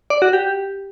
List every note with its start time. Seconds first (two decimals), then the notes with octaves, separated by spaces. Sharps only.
0.10 D5
0.22 F#4
0.33 G4